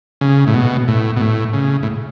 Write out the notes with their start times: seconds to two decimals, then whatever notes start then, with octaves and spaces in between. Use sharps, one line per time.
0.21 C#3
0.47 A2
0.54 B2
0.88 A2
1.16 B2
1.21 A2
1.54 C#3
1.83 A2